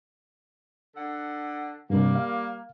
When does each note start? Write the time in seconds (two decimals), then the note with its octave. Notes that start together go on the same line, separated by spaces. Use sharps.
0.96 D3 A4 F#5
1.90 G2 C3 G3 A#3
2.15 F5